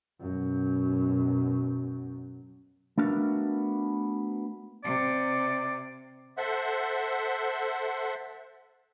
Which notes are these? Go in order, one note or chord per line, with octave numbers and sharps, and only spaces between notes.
F#2 B2
A3 B3 D4 F#4 A#4 F5
C3 D5
A4 C5 E5 F#5